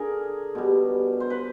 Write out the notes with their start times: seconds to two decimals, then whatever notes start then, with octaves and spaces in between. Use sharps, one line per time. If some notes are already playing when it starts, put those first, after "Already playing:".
Already playing: D3 G#4 A#4
0.55 B2 G3
1.20 C5
1.30 B4